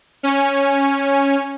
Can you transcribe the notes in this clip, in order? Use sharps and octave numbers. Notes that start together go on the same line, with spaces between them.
C#4